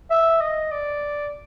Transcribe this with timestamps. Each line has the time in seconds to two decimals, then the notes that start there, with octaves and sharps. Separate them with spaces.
0.11 E5
0.41 D#5
0.72 D5